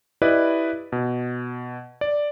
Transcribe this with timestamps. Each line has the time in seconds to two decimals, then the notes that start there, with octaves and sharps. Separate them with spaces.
0.22 E4 G4 B4 D5 D#5
0.92 B2
2.01 D5